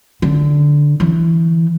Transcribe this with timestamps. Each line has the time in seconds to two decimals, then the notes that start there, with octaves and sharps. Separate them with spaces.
0.22 D3
1.00 E3